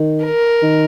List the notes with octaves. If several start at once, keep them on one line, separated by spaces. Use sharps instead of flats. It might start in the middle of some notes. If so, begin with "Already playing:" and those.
Already playing: D#3
A#4
D#3